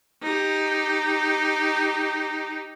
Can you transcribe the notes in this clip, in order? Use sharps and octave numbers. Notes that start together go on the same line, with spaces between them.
D#4 G4